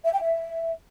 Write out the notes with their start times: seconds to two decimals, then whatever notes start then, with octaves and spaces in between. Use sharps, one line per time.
0.05 E5
0.13 G5
0.21 E5